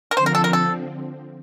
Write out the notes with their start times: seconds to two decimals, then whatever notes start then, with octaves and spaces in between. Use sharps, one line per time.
0.11 A#4
0.17 D3 F3 C4 C5
0.26 A#4
0.35 A4
0.44 A#4
0.53 A4